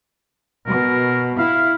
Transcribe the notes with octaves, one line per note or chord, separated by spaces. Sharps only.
B2 A#4
E4 F5